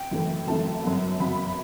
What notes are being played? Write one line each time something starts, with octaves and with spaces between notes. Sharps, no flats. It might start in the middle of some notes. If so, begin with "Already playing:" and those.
Already playing: G5
F#2 E3 A3
F#2 E3 A3 A5
F#2 F#3 B3
F#2 F#3 B3 B5